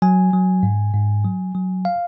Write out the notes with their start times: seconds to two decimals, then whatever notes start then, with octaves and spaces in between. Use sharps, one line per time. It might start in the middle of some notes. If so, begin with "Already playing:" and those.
0.02 F#3 G#5
0.33 F#3
0.63 G#2
0.94 G#2
1.25 F#3
1.55 F#3
1.85 F5